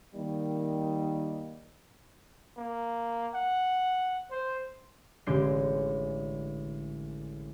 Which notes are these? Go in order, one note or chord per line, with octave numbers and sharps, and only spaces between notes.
D#3 G3 A#3 D#4
A#3
F#5
C5
A1 D3 G#3 D6 G6 C7